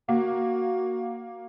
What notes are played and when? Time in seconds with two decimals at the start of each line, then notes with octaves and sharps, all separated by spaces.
0.09 A#3 F#4